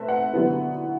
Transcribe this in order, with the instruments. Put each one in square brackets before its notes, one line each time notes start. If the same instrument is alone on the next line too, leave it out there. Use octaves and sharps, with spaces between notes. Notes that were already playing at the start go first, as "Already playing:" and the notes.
Already playing: [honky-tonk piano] A3 C4 A4 B4 E5
F#5
D3 F#3 B3 E4